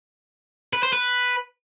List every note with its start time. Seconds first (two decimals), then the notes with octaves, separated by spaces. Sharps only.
0.73 B4
0.83 C5
0.93 B4